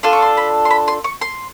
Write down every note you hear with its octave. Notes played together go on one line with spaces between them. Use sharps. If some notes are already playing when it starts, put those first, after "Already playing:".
D4 F4 A4 C6
C#6
C6
B5
C6
B5
C6
C#6
C6